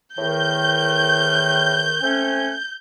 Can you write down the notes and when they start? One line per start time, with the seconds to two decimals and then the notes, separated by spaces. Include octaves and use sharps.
0.18 E2 A2 D#3 G6
2.02 A3 C4 C#4